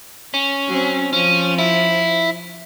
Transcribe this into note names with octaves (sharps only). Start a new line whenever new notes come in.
C#4
F#3 C4
F3 C#4
E4